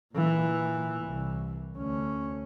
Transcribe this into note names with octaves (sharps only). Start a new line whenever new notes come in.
A#2 E3
C2
D2 C#4